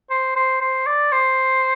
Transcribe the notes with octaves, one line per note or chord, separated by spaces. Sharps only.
C5
C5
C5
D5
C5